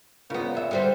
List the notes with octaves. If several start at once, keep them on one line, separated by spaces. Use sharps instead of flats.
C#2 A#2 C#3 B3
E2 E5
D3 G3 C5